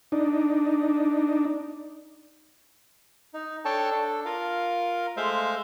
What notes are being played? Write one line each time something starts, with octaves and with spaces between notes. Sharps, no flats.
D4 D#4
D#4
D4 A4 C#5 G5 A5
D4 A4
F4 A#4 F5
G#3 A3 C5 E5 F5